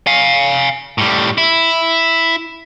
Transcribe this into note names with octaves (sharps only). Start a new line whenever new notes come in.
F5 G#5
A2 G3
E4